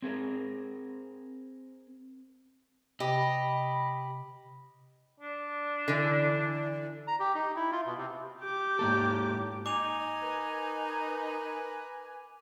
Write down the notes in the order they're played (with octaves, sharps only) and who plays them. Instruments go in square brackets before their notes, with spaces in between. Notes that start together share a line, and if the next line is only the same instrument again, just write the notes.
[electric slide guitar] C4 G#4 A#4
[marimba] C3 [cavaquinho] G4 [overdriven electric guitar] D#5 [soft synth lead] B5
[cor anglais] D4
[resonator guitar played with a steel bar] D3 E3
[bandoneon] A#5
G4
D#4
E4
F4
B2
C3
[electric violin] G4 D6 [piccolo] G6
[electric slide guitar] G#2 A#3 A4
[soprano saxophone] D#4 [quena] G#5 [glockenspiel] D6 F7
[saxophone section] A#4 B4